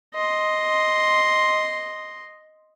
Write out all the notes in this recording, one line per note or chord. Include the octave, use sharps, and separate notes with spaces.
D#5 C6